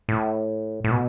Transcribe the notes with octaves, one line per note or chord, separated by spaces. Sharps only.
A2
A2
B2